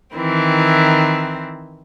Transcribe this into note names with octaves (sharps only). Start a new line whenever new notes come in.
D#3 E3 C4 E4